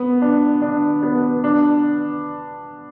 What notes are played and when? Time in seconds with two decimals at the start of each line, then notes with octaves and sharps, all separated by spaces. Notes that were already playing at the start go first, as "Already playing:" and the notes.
Already playing: B3
0.22 D4
0.62 D4
1.03 B3
1.44 D4